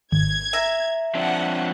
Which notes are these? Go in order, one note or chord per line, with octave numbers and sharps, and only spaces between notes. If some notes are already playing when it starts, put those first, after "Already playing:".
G#1 G#6
E5 A#5
F3 C4 D4 F#5